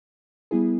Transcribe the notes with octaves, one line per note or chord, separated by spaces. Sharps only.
G3 B3 E4 G#4